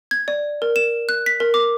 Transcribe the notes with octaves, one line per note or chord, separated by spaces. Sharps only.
G#6
D5
A#4
E7
F#6
B6
A#4
D6